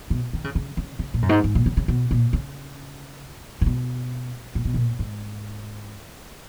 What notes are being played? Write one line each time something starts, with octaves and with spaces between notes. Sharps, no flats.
B2
D#3
C#3
C#3
C#3
C#3
A#2
F#2
G#2
G#2
A#2
C#3
C#3
B2
A#2
C#3
A#2
B2
A#2
B2
A#2
G#2